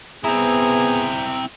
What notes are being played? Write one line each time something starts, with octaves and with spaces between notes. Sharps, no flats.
B3 C4 E4 G#4 A#5